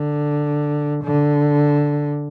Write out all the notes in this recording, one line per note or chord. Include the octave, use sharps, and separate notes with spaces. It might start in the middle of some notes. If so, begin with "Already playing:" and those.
Already playing: D3
D3